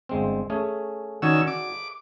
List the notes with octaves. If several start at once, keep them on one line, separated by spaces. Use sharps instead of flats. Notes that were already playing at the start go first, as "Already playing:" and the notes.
G1 G#3 C4
A3 C#4 G#4
D#3 C#4 F#4 D5 G#5 E6
D6